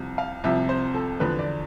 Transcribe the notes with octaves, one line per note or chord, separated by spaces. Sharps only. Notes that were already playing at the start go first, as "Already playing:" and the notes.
Already playing: C2 C3 F3
F5
C2 C3 F3 E5
C5
A4
E2 D3 F3 B4
D5